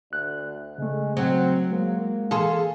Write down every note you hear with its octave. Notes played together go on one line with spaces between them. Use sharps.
D2 F#6
C#3 G#3 A3
F#3 C4
G#3 A#3
E3 G#4 A4 F5 C6